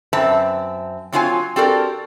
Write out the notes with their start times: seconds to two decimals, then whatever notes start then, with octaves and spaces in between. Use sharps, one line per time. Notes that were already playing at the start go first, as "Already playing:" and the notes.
0.13 F#2 C4 B4 E5 A5
1.13 F#3 C4 D4 F4 C#5 G#5
1.56 C4 F#4 G4 A4 A#4 D5